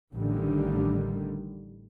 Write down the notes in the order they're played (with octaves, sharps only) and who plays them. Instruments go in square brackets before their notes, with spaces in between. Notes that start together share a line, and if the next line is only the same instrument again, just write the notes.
[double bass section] A1 D3 D#3 G3